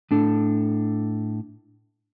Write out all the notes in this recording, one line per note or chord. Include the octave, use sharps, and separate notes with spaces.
A2 D4 A4